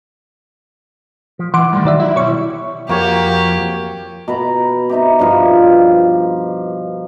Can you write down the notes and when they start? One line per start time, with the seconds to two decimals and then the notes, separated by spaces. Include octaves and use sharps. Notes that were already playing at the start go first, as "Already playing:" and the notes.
1.39 F3
1.54 E3 E4 F#5 C6 D6
1.72 A2 D#3 G3
1.85 D#3 F#3 D5 E5
2.00 E4 E5
2.16 B2 G3 C#5 C#6
2.89 F2 F3 A#3 F#4 G4 C#5
4.28 B2 B4 A#5
4.89 C4 D#4 E4 G4
5.19 G2 B2 F3